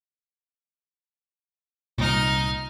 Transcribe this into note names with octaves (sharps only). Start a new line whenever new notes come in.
C2 A#2 D#4 F6